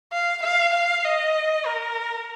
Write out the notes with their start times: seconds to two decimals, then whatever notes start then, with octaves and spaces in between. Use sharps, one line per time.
0.13 F5
0.43 F5
0.74 F5
1.05 D#5
1.66 A#4